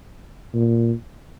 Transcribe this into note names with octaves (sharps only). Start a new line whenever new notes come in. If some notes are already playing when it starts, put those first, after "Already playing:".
A#2